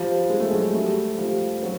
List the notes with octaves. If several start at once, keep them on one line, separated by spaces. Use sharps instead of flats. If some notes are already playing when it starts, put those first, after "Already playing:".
Already playing: F3 G3
G#3
A3
F#3 G#3
G3 A3
F3 G3
F#3